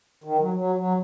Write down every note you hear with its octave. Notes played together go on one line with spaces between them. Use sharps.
D#3
F#3
F#3
F#3